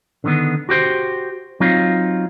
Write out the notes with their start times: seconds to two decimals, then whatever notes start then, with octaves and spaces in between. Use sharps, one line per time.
0.24 D3 D#3 B3
0.69 F#4 G4 C5
1.60 F#3 C4 D#4 F4